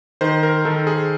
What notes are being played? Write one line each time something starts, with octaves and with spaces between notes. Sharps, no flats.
D#3 C5
A#4
D#3 A4
G#4